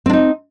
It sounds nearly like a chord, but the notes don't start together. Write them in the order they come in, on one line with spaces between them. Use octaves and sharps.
C4 D4 D#4